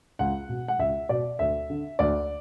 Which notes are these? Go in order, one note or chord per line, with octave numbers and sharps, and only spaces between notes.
C#2 F#5
B2
F#5
C#2 E5
B2 D5
D2 E5
D3
D2 D5